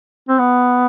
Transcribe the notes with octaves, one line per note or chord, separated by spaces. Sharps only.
C4
B3